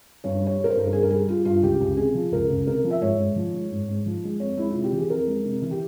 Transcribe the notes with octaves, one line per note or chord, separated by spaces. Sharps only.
G2 C#5
G3
C#5
G3
A#4
C5
G2
A#4
G2 G#4
A#4
G3 G#4
G3 F4
G2 F4
C#2 G4
C#2
C3 G#4
F3
C#2 A#4
C#2
C3 A#4
F3
E5
G#2 C#5
G#2
F3
G#3
G#2
G#2
F3
G#3
F2 C#5
G#3 E4
C3 F4
G4
E3 G#4
F2 A#4
G#3
C3
E3
G4